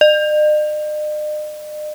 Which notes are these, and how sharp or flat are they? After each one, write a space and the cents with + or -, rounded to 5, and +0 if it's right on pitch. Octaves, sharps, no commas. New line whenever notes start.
D#5 -45